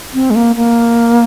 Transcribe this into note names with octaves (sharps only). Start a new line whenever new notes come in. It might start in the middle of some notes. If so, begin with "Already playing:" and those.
C4
G#3
A#3
A#3